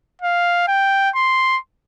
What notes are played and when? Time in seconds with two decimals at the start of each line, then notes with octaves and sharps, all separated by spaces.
0.22 F5
0.68 G5
1.15 C6